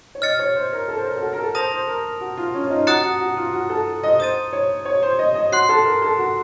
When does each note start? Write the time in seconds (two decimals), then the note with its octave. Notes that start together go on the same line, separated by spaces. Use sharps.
0.15 C#5
0.22 D#5 F6 A6 C#7
0.39 C#5
0.55 C5
0.73 A#4
0.88 A4
0.97 C5
1.05 A#4
1.16 A4
1.21 F#4
1.33 A#4
1.39 A4
1.55 C5 A5 D#6 A#6 F7
1.71 C5
1.88 A#4
2.21 F#4
2.38 F4
2.55 C#4
2.66 F4
2.70 D#4
2.87 F#4 A#5 D#6 F#6 A6 C#7
3.03 F#4
3.21 F#4
3.37 F4
3.53 F#4
3.70 A4
4.03 D#5
4.19 C5 D#6 A6 D#7
4.53 C#5
4.85 C#5
5.03 C5
5.19 D#5
5.35 D#5
5.52 F#4 C6 F#6 C7
5.69 A4
5.85 A#4
6.02 A4
6.19 F#4